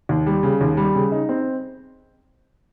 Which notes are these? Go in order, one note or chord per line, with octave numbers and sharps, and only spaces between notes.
D#2
G3
C#3
D#2
G3
C#3
D#4
C4